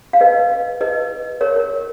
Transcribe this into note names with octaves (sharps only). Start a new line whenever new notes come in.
F5
B4 D#5
B4 D#5
A#4 C#5
A#4